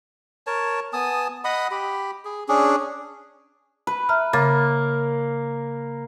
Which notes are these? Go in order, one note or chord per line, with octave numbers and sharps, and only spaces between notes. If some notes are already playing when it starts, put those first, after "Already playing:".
A#4 C#5 A5
B3 G#5 A5 D#6
D#5 F#5 B5 D#6
G4 B5
G#4
C#4 D4 G#4
B4
E5 A#5 F6
C#3 A#3 A6